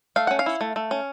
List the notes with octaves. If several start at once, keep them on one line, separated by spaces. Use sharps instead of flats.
A3 F5
C#4 F#5
F5
E4
A3
A3
C#4